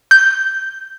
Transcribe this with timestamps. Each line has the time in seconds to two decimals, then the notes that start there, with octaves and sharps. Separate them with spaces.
0.11 G6